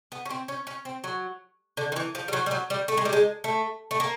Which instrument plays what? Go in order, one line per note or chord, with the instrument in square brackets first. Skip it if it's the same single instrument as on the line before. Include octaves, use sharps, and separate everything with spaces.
[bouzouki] B3
C#4
C4
C#4
C#4
C4
F#3
D3
D#3
E3
F3
G3
F#3
G3
F#3
G3
A3
G#3
G3
G#3
A3
A3
A#3